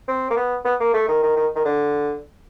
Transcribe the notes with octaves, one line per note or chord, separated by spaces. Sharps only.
C4
A#3
B3
B3
A#3
A3
D#3
D#3
D#3
D#3
D3